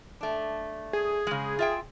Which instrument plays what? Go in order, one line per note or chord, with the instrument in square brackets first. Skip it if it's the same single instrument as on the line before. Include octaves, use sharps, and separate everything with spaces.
[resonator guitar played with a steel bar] A3 D4
[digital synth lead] G#4
[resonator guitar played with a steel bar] C#3 G#3
F4 E5 G5